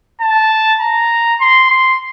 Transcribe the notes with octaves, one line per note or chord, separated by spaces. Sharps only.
A5
A#5
C6
C6